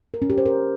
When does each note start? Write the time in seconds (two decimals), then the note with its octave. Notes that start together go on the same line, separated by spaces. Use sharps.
0.14 A#4
0.22 C#4
0.30 G4
0.38 C5
0.46 A#4